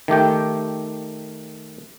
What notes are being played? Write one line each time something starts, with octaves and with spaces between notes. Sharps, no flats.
D#3 A3 G4 G5